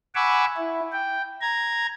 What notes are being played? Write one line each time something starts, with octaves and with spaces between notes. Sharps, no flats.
F#5 G#5 B5 C#6 D6 E6
E4
G5
A#5 G#6